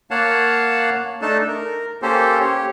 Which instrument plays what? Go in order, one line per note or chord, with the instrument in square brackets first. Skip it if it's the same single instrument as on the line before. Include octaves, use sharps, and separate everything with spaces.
[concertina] A#3 C#5 F5 F#5 A5
A3 D4 D#4 A4 A5
A#4
A#3 C#4 G4 A4 C5
G4 C#5